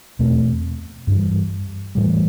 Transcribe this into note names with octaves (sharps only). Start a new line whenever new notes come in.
E2 B2 A3 C4
G2 E3 G3
A2 E3 G3